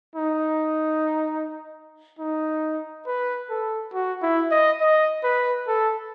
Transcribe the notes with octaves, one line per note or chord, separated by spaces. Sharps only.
D#4
D#4
B4
A4
F#4
E4
D#5
D#5
B4
A4